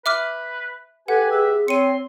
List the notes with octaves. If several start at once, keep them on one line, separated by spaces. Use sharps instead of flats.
B4 E5 D6 F6
G4 A4 B4 F#5 G#5
G#4 E5
C4 C#5 C6 C#7 D#7